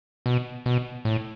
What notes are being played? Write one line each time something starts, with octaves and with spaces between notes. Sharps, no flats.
B2
B2
A2